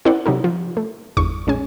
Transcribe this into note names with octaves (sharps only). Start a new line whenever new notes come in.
C4 E4 A#4 C5 D5 F#5
C3 F#3 D#4 A4
F3
A3
G1 E2 C#6
A#1 G#3 C#4 G#5